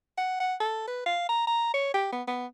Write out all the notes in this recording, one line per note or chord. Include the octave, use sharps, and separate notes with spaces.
F#5
F#5
A4
B4
F5
A#5
A#5
C#5
G4
B3
B3